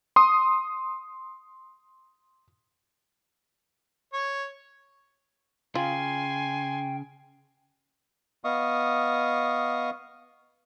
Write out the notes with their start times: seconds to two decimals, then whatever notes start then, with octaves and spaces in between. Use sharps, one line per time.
0.16 C6 D#6
4.13 C#5
5.75 C#3 F4 G5 G#5 C6
8.44 B3 D#5 F5 C#6 D#6